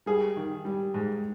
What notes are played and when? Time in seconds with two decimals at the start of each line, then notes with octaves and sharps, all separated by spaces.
0.06 G3 G#4
0.37 D#3
0.65 G3
0.94 G#2